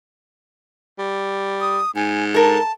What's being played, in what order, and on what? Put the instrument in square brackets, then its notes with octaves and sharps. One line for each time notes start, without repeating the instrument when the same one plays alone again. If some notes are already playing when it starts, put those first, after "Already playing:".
[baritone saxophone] G3
[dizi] D#6
[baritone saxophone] G#2 [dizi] G#5
[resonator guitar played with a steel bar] A4 A#4 [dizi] A5